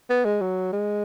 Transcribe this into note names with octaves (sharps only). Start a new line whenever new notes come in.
B3
G#3
F#3
G#3